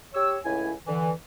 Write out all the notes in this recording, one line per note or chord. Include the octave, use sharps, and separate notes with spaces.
G4 C#5 E6
C#2 A2 E4 G#5
D3 E3